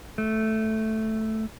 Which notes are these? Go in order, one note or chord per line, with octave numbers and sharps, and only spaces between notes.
A3